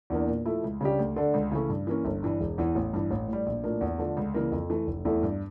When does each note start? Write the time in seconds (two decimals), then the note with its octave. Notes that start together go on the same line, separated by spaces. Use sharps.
0.10 E2 E3 A#3 D4
0.28 A#2
0.46 F3 A3 E4
0.64 C#2
0.81 C#3 G3 D4 G4
0.99 D2
1.16 D3 A3 D4
1.34 C#2
1.52 C#3 E3 A3 C#4
1.69 G2
1.87 E3 A#3 C#4
2.05 G1
2.23 G2 E3 G3
2.40 E1
2.58 E2 E3
2.75 A1
2.93 G2 E3
3.11 A1
3.28 A2 G3
3.46 A#1
3.64 A2 F3 A#3 D4
3.81 E2
3.99 D3 F3 A3
4.17 C#2
4.34 C#3 E3 G3 A#3
4.52 F2
4.70 E3 A3
4.87 F1
5.05 E2 E3 A3 E4
5.23 G2